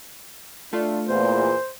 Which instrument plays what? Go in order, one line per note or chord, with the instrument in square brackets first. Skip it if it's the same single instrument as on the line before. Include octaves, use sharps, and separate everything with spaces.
[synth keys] A3 F4 [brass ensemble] D4
[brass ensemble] E2 A#2 [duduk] C5